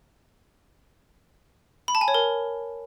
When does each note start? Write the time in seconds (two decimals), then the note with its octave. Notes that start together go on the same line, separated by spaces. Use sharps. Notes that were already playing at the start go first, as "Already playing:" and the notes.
1.88 B5
1.95 A5
2.01 G#5
2.08 C#5
2.14 A#4